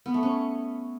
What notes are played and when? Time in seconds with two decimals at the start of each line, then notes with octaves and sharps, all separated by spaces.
0.06 B3
0.14 A3
0.23 C#4